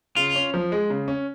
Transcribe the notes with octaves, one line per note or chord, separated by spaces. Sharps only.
C#3 F4
C#4
F3
G#3
C#3
C#4